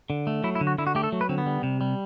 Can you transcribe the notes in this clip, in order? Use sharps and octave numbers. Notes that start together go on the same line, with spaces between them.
D3
A3
F#3 E4
E4
D3
F#4
D3 E4
F#4
A3 G4
A4
F#3
B4
D3 C4
B3
G3
C3
G3